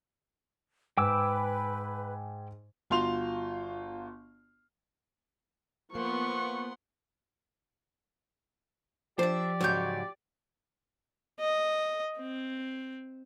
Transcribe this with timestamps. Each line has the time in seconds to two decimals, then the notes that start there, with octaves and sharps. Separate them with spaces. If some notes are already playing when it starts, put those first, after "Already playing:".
0.98 G#2 B4 G5 G#5 D6 E6
2.90 G1 F4 F#4 C6 F7
5.95 F3 A#3 B3 B4 F#5 C6 C#6
9.19 F3 D4 G4 C5 D5 E5
9.61 G#2 C#3 F#3 C#5 G6
11.40 D#5
12.18 C4